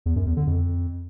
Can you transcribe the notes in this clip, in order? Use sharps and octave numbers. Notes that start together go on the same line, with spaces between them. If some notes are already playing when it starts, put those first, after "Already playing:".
E2
F#2
E2
D3
F2